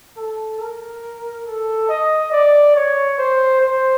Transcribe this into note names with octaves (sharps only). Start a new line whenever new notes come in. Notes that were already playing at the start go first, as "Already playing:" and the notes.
A4
A#4
A4
D#5
D5
C#5
C5
C5